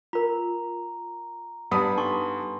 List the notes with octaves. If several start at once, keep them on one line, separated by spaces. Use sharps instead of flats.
F4 A#4 A#5
G2 B3 D4 B5 D#6
D#4 A4 G#5 C6 C#6